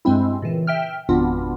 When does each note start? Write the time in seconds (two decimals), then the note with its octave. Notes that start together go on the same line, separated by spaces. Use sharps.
0.05 G2 G#3 C4 E4
0.42 A#2 C#3 E3
0.67 E5 G5 F6
1.09 G#1 F2 B2 B3 D4 F4